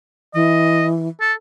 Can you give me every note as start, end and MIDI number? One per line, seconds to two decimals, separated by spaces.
0.34 1.08 52
0.34 0.87 75
1.21 1.33 69